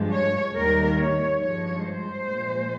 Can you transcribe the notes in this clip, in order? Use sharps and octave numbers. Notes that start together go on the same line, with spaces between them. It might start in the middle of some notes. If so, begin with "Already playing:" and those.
Already playing: G2 F3 G#3
C#5
D#2 D#3 G3 A#4
C#5
G2 F3 G#3 C#5
C5
A#2 F3 G#3